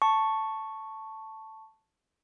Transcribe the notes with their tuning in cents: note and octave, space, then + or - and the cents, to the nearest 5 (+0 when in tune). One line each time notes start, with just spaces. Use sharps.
A5 +0 C#6 +0